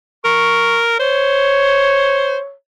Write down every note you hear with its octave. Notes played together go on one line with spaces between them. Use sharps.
A#4 C#6
C5 C#5